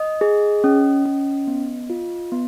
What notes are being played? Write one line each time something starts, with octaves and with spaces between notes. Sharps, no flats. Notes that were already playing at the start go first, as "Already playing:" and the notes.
Already playing: D#5
G#4
C#4
C#4
B3
F4
B3